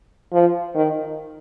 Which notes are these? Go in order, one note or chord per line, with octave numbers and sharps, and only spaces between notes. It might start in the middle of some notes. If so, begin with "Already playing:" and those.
F3
D#3